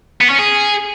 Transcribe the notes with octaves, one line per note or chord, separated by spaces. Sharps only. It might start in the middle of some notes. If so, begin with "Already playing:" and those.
B3
C#4
G#4